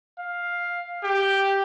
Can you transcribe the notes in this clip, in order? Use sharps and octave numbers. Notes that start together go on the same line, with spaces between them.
F5
G4